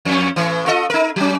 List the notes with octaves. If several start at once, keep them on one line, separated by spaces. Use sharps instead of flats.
F2 C#4
A2 E3
F4 A4 D#5
D#4 A#4
F#3 C#4